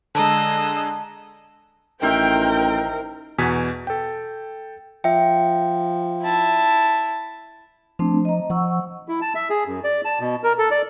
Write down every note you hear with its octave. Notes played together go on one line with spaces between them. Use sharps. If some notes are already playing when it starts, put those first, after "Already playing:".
D3 G#3 D#5 A5 A#5 E6
A1 D#3 A#4 C5 E5 G5
E2 B2 G#5 G#6 B6
A4 G5
F3 E5 G5
E4 A5
F3 A3 C4 D4
D#5 A#5
F3 F#5 C#6 E6
E4
A5
E5
G#4
F#2
D5
A5
B2
A#4
A4
D5